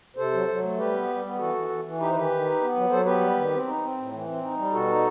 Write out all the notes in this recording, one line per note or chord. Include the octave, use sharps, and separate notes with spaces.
C3 A4 C5
F#3
F#3
A3
G3 G4 B4
B3
G3
B3
G4
E3 F#4 A4
E3
E3
E3
D#4 G4 B4
C5
D#3 G4 B4
D#3
D#4
B3
F#3
F#3 A4 C5
B3 G4 B4
G3
D#3
C4
D#4
C4
A2
E3
C4
D#4
G3
B2 F#4 A4
D#4